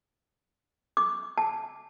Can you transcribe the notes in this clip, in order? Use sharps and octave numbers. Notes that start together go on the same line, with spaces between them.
D6
A5